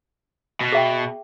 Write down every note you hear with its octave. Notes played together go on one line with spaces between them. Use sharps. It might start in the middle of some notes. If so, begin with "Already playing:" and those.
B2
G#4 E5 G5